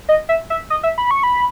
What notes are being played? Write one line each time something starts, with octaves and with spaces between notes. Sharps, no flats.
D#5
E5
E5
D#5
E5
B5
C#6
B5